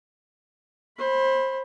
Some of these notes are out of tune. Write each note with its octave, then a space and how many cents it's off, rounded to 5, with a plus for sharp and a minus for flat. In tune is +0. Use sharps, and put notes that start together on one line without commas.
C5 +25 B5 +0